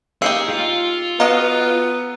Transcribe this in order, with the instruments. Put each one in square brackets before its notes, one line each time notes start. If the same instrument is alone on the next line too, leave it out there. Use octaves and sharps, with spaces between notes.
[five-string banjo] A#3 D#4 G4 [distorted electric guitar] G#4 [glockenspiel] E6 C7 C#7
[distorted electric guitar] F4
[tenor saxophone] B3 [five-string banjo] F#4 D#5 F5 [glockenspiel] A#5